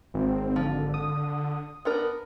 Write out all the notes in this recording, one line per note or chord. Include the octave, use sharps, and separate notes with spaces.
G#1 C4
D3 F3
D#6
B3 D4 A#4